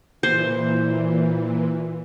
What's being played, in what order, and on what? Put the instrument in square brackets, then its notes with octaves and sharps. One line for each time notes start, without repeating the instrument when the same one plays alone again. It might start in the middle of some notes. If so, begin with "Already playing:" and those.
[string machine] A#2 E3 [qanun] C5